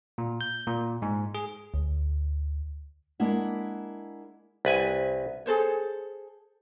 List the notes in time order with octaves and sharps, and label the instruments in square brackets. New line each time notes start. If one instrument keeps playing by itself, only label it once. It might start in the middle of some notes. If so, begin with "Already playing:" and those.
[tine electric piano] A#2
G6
A#2
G#2
G#4
[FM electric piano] D2
[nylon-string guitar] G#3 A#3 D4 E4 F#5
[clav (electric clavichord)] C2 B4 G#5
[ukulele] G#4 A4 C5 C#5